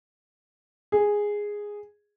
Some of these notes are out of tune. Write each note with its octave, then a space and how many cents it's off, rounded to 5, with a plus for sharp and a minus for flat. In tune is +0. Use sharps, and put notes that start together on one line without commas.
G#4 -5